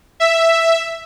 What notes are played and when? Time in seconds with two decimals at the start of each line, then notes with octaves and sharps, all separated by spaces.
0.20 E5